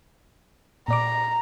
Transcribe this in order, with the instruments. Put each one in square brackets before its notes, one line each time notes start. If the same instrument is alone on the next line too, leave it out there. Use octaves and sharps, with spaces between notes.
[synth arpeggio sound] A#2 D5 D6 [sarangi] A#5